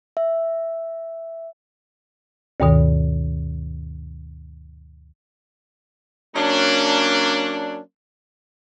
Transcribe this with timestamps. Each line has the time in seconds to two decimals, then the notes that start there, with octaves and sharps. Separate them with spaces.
0.17 E5
2.60 D2 G2 B2 D#3
6.36 F#3 A#3 C#4 D4